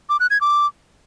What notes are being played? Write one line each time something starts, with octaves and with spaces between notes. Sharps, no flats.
D6
F#6
G#6
D6